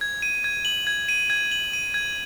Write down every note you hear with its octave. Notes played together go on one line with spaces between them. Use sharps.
G#6
D#7
G#6
F#7
G#6
D#7
G#6
F#7
D#7
G#6